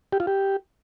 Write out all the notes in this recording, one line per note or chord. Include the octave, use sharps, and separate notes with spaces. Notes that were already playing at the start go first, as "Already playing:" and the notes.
G4
F4
G4